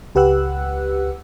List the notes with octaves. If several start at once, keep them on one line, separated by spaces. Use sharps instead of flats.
C#2 G4 B4 F#5 E6 F#6